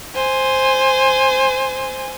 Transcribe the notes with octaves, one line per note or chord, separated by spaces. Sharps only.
C5 G#5